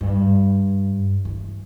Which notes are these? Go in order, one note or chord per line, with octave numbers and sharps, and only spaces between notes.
G2
E3